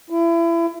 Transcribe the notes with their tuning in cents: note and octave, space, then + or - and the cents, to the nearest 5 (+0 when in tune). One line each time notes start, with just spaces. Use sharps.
E4 +30